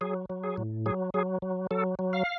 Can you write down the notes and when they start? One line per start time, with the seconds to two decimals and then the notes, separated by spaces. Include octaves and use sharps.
0.01 F#3 G#4
0.30 F#3
0.44 G#4
0.57 A2
0.86 F#3 G#4
1.14 F#3 G#4
1.42 F#3
1.71 F#3 A4
1.99 F#3
2.13 F5